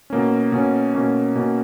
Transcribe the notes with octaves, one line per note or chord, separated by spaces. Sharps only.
B2 A#3 C#4
B2 A#3 C#4
B2 A#3 C#4
B2 A#3 C#4